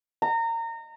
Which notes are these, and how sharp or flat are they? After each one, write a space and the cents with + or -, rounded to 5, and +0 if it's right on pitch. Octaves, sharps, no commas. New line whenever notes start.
A#5 -25